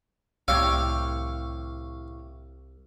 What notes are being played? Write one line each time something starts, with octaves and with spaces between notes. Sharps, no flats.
C2 A2 G4 C#5 F5 E6